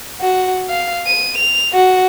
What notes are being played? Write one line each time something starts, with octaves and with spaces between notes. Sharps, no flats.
F#4
F5
D#7
F7
F#4